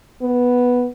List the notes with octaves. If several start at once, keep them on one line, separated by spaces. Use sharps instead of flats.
B3